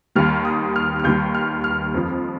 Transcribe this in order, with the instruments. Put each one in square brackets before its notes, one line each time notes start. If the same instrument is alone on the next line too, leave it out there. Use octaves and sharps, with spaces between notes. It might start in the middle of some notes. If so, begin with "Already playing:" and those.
[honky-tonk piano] D#2 D#3 G3 F6
D#6
F6
F6
D#2 D#3 G3 G6
F6
F6
F2 F3